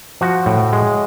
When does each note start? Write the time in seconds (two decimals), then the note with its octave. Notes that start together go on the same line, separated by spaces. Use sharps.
0.21 F3 F#4
0.46 A2
0.73 G#3